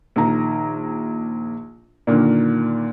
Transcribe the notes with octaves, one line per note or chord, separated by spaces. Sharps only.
A#1 D#3 A#5
A#2 D3 D#3 A#3